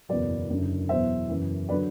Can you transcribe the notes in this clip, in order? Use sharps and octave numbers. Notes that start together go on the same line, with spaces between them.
F#1 E2 B2 F#3 B4 D5
F#1 F#2 D3
E2 B2 F#3 C5 E5
F#1 F#2 E3
D3 F#3 B4 D5